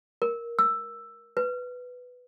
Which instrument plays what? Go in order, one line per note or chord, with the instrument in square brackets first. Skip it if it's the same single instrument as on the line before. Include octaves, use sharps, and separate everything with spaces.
[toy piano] A#4
E6
B4